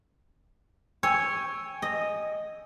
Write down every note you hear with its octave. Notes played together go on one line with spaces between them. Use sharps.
C#5 G5 G#5 E6
D#5